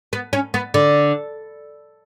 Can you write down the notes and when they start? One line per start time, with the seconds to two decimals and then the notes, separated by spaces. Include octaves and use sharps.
0.13 B3
0.33 C#4
0.54 B3
0.74 D3